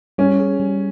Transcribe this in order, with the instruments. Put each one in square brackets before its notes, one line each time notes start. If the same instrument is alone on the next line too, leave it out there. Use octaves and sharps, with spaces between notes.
[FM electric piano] G3 [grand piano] C#4
[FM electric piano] G#4
G3